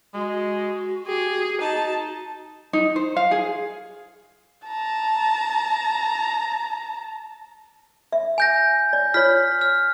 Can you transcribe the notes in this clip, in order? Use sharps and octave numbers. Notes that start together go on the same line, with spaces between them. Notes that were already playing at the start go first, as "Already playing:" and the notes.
G#3 F#4
G4 G#4
D#4 A5
D#4
C5
F5
G#4
A5 A#5
E5
G#5 G6 A#6
D5
F4 C#5 F6 B6
F6